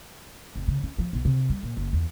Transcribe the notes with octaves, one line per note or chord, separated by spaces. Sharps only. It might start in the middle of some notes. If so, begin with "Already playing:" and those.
F1
C#3
C#4
F3
B1
C3
G3
A#2
F#1
E2